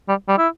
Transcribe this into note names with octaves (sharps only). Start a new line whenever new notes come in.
G3
G3
E4